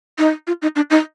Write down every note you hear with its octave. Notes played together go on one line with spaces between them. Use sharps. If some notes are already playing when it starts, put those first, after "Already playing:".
D#4
F4
D#4
D4
D#4